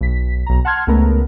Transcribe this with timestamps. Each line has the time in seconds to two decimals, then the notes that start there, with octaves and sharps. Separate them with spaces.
0.01 B1 B6
0.46 B1 A#5
0.65 F#5 A5 C6 F6 G#6
0.87 C#2 A3 B3 A#4